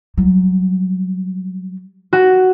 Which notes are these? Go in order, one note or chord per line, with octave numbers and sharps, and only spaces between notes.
F#3 G3
F#4